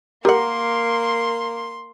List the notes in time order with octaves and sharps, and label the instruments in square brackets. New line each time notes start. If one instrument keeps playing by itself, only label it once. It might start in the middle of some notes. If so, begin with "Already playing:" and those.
[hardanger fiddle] A#3 [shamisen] G4 F#5 [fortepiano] A#4 [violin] C6